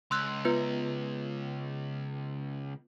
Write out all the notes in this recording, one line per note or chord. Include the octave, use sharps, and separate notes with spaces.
C#2 C6 E6 F#6
B3 F4 B4